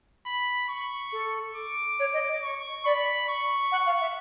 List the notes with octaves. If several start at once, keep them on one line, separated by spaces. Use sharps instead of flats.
B5
C#6
A4
D6
C#5
D#5
C#6
D5 B5
C#6
F#5
F5
E5